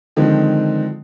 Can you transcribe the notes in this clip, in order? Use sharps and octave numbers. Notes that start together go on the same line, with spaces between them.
D3 D#3 F3 G#3 C4 D#4